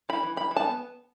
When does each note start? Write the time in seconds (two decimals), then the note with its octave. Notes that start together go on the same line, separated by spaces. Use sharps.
0.09 E4 B5
0.23 E3
0.37 E3 B5
0.51 E3
0.57 A5
0.66 B3